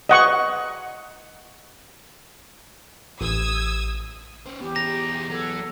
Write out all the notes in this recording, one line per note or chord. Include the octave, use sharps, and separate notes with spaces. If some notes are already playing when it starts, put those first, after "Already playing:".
D#5 F#5 C#6
A1 D#6 E6 G#6
C#4 C5
E3 B3 G4
B2 A#5 A#6
F#3 A4 C#5